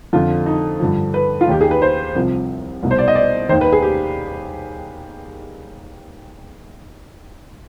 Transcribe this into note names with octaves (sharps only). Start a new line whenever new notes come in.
F2 D3 F3 F4
D#4
G2 D3 F3
B4
F4
D#2 D#3 G4
G#4
B4
C5
C2 C3 F3
C2 B2
C5
D5
D#5
D5
D#2 D#3 C5
B4
G#4
G4